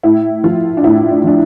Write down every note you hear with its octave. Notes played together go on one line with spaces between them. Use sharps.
A2 E4
F3 F4
D4
A2 E4
D4
F3 D4